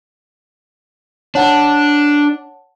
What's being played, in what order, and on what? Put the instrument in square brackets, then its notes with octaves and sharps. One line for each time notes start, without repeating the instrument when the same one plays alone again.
[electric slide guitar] D4 [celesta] C#5 F#5 A5